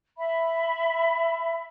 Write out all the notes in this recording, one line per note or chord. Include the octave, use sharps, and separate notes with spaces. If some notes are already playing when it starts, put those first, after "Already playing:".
E5 B5